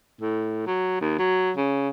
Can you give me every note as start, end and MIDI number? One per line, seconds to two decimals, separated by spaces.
0.21 0.67 45
0.67 1.01 54
1.01 1.18 39
1.19 1.52 54
1.56 1.89 49